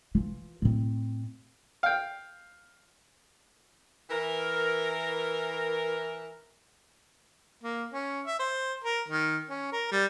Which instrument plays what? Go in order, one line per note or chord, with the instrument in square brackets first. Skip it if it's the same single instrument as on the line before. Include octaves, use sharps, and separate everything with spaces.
[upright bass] E3 F4
A2 C4
[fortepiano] F5 G5
[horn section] E3 A#4
[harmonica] A#3
C#4
E5
C5
A#4
D#3
C#4
A#4
G3